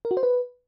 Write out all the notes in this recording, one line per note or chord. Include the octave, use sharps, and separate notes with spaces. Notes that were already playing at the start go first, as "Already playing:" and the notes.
A#4
F#4
C5
B4